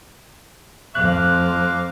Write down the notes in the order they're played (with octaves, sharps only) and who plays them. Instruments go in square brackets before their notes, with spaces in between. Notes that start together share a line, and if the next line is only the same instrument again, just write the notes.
[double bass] F2 [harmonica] F5 D6 [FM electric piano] F#6